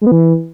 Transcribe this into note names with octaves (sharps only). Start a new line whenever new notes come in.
G#3
B3
E3